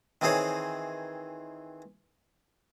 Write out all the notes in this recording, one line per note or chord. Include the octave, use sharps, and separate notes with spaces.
D#3 E3 C4 G#4 C5 C#5